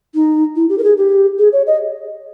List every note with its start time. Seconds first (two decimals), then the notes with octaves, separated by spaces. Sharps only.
0.15 D#4
0.56 E4
0.69 G4
0.78 A#4
0.84 G#4
0.97 G4
1.39 G#4
1.53 C#5
1.67 D#5